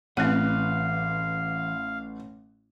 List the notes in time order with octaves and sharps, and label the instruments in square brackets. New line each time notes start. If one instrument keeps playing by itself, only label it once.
[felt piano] A1 F#6 [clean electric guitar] E3 G#4 B4 [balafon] C4 F#5 [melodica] F5